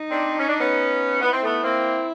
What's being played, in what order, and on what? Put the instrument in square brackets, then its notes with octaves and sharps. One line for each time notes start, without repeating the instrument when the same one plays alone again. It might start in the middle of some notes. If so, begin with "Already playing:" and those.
Already playing: [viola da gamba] D#4
[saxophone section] C4 D4
C#4
D4
B3 C#4
[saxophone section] B3 [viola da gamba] E4
[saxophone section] C4
A3 B3
A#3 C4